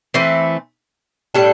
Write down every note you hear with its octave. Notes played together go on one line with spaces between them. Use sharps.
E3 A3 C4
A2 G3 D4 A4